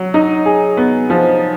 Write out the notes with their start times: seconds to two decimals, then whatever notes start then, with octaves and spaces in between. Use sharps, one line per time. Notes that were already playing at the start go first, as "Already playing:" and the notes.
Already playing: F#3
0.14 D#4
0.46 G#4
0.77 B3
1.10 F3